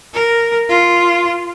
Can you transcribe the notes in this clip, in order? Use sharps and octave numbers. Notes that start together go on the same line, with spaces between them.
A#4
F4